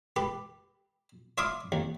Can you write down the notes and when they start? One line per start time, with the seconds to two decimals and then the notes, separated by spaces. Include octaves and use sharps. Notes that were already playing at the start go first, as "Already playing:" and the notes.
0.16 G4 B4
1.38 C#5 E5 F5 C6 D6 D#6
1.72 D#2